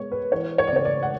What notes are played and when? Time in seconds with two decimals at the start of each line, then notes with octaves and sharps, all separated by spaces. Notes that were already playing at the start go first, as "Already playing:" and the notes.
Already playing: B2 G#3 C#5
0.12 B4
0.32 E3 C#5
0.58 C#5
0.67 D5
0.72 C#3 C#5
0.85 D5
1.03 F#5